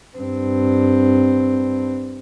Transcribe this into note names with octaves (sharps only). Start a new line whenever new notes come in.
G2 C4